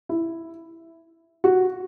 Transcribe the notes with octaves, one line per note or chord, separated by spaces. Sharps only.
E4
F#4